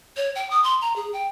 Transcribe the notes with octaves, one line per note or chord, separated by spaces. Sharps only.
C#5
G5
D#6
C6
A#5
G#4
G5